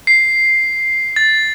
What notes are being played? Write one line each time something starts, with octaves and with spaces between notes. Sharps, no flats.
C7
A6